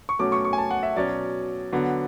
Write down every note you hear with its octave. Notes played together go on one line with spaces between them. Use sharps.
C#6
B2 F#3 A3 C#4 D6
C#6
C#6
G#5
A5
F#5
E5
B2 F#3 C#4 D5
D3 F#3 B3